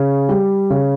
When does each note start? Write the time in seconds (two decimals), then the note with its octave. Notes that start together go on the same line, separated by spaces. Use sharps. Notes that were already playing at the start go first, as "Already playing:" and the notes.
Already playing: C#3
0.29 G3
0.70 C#3